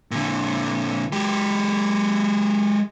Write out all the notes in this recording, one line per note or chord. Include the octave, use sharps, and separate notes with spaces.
A#2 D3
G#3 G4